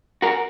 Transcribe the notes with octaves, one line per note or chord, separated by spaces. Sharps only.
F#4 A#4